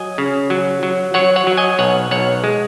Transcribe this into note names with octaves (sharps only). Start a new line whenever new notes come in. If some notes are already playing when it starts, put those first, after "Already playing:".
Already playing: F#3 D#5 G#5
C#3
F#3
F#3
F#3 C#5 F#5
C#5 F#5
F#3
D#5 G#5
B1 C#5 F#5
B1 C#5 F#5
G#3